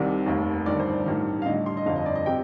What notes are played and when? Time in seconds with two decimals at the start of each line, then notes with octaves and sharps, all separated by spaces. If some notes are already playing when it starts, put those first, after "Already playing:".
Already playing: C2 C3 D#3 D5
0.26 F1 D#2 D#3
0.66 G1 G2 D#3 D5
0.79 C5
0.93 D5
1.06 A1 G2 D#3
1.42 F5
1.46 A1 G2 D3 D#5
1.66 C6
1.77 D#5
1.86 G1 F2 D3 F5
1.96 D#5
2.06 D5
2.15 D#5
2.26 C3 G5